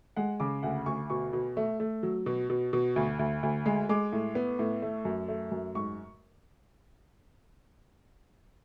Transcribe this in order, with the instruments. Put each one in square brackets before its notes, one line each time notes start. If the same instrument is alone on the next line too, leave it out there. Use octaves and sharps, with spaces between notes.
[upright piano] G#3 F#5
C#3 D6
D2 F#5
D2 C#6
B2 C#6
B2
A3
A3
F#3
B2
B2
B2
D2
D2
D2
G#3
G#3 D6
A2
B3
A2
A3
F#2
A3
F#2
G#2 C#6